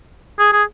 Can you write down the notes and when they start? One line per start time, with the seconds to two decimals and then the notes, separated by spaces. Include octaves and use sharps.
0.40 G#4
0.53 G#4